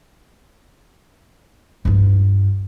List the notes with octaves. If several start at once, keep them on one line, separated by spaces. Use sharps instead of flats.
G2 F4